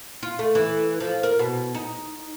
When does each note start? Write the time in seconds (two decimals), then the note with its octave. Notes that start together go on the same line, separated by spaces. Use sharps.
0.23 F4
0.39 A3
0.55 E3
1.00 F3
1.23 A#4
1.39 B2
1.75 D#4